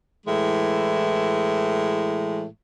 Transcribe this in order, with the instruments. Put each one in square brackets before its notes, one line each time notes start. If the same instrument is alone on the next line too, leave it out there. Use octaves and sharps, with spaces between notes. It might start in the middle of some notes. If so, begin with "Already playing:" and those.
[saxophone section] A2 E3 G#3